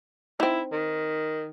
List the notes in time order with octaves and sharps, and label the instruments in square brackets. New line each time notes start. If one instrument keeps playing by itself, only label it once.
[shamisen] C4 D#4 [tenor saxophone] E4
[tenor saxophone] D#3